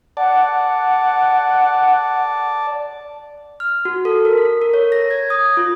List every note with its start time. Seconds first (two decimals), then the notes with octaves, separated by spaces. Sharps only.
0.17 D5 F#5 A5
3.60 F6
3.85 F#4
4.05 A4
4.25 A#4
4.38 B6
4.61 A#4
4.74 C#5
4.92 A#6
5.11 G#6
5.30 D#6
5.57 F4